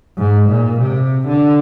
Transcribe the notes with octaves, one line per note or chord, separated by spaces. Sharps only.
G#2
A#2
C3
D3